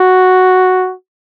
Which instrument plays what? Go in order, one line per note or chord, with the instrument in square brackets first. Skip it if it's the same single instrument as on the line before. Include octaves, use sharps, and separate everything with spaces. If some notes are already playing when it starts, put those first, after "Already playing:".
Already playing: [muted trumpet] F#4